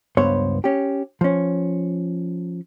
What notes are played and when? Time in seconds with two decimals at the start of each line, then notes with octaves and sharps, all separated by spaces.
0.17 C#2 G2 B3 C5 C#5
0.64 C#4 G4
1.21 F3 C#4